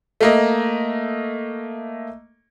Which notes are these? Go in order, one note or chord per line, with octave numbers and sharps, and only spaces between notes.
A3 A#3 D#5